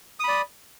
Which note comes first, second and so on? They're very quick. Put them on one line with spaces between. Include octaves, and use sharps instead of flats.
D#6 B5 D5